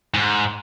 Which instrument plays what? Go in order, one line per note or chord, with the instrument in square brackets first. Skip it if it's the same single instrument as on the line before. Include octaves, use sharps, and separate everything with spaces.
[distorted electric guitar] G#2